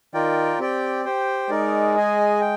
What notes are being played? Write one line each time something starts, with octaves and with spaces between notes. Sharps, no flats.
D#3 F4 A#4 D5 G5
C4 G4 D5 G5
G4 C5 G5
G#3 D#4 A#4 D5
G#4 D#5 G#5
G5